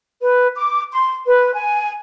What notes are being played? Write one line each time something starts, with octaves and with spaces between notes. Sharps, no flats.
B4
D6
C6
B4
G#5